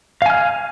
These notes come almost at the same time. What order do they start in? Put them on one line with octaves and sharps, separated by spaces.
F5 G#5 F6